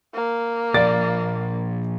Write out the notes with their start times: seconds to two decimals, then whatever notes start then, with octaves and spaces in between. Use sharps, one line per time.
0.15 A#3
0.74 A#2 F3 D5 A6 D7